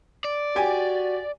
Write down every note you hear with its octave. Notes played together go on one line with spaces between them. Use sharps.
D5
F#4 G4 G#5